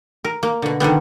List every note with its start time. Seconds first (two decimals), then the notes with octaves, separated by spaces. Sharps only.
0.24 A#4
0.43 A#3
0.62 B2 D3
0.80 D3 D#3 G3 B3